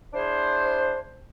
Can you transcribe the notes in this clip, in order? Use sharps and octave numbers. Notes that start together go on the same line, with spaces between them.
D4 E4 G#4 C5